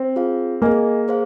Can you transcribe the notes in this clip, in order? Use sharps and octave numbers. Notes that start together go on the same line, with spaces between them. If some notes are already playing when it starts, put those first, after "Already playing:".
Already playing: C4
F4 G#4 F5
A#3 G#4 D#5 G#5
G#4 C5 F5